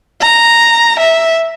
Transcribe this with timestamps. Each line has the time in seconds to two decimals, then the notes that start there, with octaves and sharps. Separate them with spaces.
0.21 A#5
0.99 E5